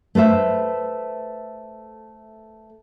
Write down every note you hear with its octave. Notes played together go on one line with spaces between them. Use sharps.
A3 B4 C5 E5